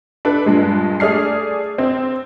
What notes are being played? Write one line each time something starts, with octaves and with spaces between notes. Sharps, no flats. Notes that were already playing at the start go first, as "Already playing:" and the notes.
D4 A4 B4
G2 A#2 G#3
A3 G#4 D5 F6 C7
C4